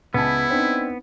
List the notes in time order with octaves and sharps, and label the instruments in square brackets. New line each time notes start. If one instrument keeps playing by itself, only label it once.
[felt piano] C#2 G#5 A5 [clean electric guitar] B3 [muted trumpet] E4
[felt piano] C4 D4 D#4